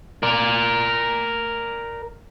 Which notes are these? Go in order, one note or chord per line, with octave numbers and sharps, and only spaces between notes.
A#4 D5